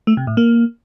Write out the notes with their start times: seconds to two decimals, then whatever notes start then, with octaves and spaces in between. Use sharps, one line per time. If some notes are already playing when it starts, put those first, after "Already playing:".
0.07 A3
0.17 C3
0.27 A2
0.37 A#3